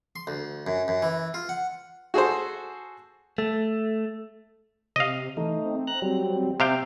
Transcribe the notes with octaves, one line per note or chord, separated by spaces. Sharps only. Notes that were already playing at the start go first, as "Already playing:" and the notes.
C6
D2
F#2
F#2
E3
F4
F#5
F#4 G#4 A4 C5
A3
C3 D#5 F5
E3 A3 D#4
C4
A#5 F#6
F#3 G3
C3 F5 G5